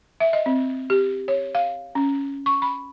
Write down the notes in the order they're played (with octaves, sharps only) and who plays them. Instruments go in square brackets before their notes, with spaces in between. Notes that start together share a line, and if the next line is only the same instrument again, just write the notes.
[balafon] E5
D#5
C4
G4
C#5
F5
C#4
C#6
B5